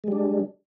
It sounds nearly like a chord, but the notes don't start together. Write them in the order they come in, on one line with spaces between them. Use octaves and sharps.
G#3 G3 D4